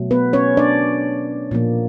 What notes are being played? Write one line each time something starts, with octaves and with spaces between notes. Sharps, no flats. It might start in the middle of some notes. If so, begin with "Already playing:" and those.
Already playing: B2 F#3 A3
B3 B4
C#4 C#5
D4 D5
A#2 F3 A#3